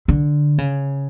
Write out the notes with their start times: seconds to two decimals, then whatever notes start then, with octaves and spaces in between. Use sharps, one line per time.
0.08 D3
0.58 C#3